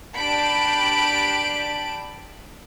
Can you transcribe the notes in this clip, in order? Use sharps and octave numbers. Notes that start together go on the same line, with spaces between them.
D4 G4 A5 B5 D7